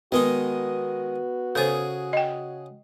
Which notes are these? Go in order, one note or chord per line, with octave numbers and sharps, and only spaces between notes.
D#3 G#3 B3 D#4 F#4
C#3 G#4 A4 C5
D#5 G5